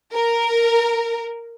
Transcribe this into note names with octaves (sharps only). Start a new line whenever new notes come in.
A#4